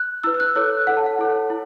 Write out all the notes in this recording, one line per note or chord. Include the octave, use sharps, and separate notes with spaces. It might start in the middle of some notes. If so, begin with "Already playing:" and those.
Already playing: F#6
E4 B4 E6
E6
F#6
E4 A4 C#5 E6
E4 A4 C#5 F#5
A5
F#5
E4 A4 C#5
E4